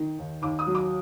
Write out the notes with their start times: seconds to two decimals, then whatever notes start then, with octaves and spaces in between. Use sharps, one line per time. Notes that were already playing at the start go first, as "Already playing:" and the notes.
Already playing: D#3
0.18 D#2
0.42 D#2 D6
0.59 D#6
0.66 F#3
0.75 D6